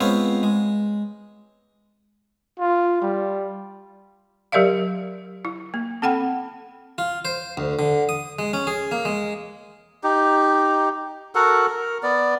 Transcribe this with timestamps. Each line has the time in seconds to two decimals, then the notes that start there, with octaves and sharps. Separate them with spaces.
0.01 G#3 B3 C4 F4 C#5
0.43 G#3
2.59 F4
3.02 G3
4.52 F#3 G4 A#4 D5 E5 F5
5.45 E4
5.74 A#3
6.02 C4 A4 F#5 G5 B5
6.98 F4
7.25 C5
7.57 D2
7.79 D3
8.09 D#6
8.39 G#3
8.53 C#4
8.67 G#4
8.92 A#3
9.05 G#3
10.03 D#4 G4
11.35 F#4 A4 A#4 F#5
11.68 A#4
12.03 B3 D5